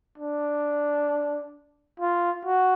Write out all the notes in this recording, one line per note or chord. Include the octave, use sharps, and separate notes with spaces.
D4
F4
F#4